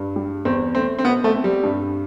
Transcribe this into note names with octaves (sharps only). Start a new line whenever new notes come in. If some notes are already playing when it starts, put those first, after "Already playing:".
Already playing: G2
G3
E2 C4
A3 C4
C4
B2 B3
A3
C4
G3
G2